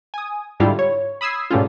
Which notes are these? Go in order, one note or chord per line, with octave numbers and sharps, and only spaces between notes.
G#5 D#6
G#2 D3 G3 E4 F4
C#5
B5 D#6 E6 G#6 C7
G#2 B2 G3 A3 C#4 F4